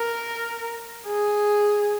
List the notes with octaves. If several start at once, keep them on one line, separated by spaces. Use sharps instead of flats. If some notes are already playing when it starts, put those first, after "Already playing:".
Already playing: A#4
G#4